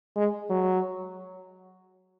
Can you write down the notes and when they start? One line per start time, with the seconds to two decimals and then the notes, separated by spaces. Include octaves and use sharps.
0.17 G#3
0.50 F#3